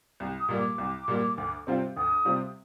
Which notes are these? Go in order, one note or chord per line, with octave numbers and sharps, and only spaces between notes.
C2
D#6
A#2 G3 A#3
D6
C2
A#2 G3 A#3
D2
C3 G3 C4 F4
D2 D#6
C3 G3 C4 F4